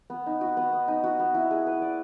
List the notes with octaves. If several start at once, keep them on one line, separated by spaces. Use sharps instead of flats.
B3
D#4
F#4
B3
B3
D#4
F#4
B3
E4
G#4
B4
D5